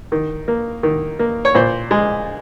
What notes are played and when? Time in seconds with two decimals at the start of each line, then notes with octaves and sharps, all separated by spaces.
0.12 D#3
0.48 A#3
0.83 D#3
1.19 A#3
1.45 C#5
1.55 A#2 C5
1.91 G#3